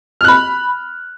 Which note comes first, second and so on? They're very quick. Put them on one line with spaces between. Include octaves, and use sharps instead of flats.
F6 F#6 B5